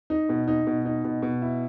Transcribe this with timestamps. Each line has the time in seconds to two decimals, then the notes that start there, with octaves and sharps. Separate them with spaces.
0.10 D#4
0.29 B2
0.48 D#4
0.67 B2
0.85 D#4
1.04 B2
1.22 B2
1.42 E4